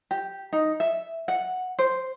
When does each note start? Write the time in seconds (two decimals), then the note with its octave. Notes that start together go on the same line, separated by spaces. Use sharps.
0.11 G4
0.53 D#4
0.80 E5
1.28 F#5
1.79 C5